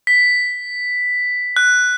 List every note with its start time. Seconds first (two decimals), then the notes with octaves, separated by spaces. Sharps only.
0.07 B6
1.56 F#6